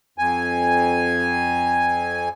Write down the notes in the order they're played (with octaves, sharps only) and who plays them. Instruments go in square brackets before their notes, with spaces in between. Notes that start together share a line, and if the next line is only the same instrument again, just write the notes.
[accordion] F2 G#5